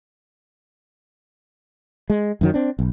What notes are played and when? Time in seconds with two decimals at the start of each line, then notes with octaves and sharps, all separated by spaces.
2.10 G#3
2.41 F#2 D#3 F#3
2.54 C4 D4
2.79 B1